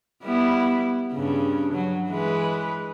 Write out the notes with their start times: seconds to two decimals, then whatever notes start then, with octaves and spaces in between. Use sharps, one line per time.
0.23 G3 B3 E4
1.13 G2 C#3
1.74 F#3
2.09 E3 G#3 B4